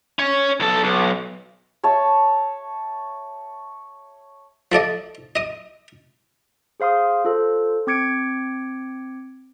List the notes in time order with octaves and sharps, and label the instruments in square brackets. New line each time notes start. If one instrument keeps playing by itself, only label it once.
[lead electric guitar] C#4 C#5
B1 A4
B1
[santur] C#5 E5 A5 C#6
[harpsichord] F3 A4 D5 D#5
D#5 D#6
[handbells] G#4 C5 F5 C6 D#6
F4 A4 C5
C4 D6 G#6 C#7 D7